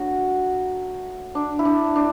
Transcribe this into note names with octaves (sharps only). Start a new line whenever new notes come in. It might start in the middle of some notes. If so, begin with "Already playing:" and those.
Already playing: D3 F#3 A3 F#4
D4
E4
D4
A2 D4